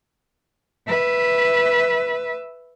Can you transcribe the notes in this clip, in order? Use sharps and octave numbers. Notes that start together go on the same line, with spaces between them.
B4 E5